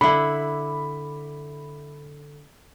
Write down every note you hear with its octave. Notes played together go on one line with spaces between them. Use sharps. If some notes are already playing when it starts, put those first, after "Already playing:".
D3 E4 B5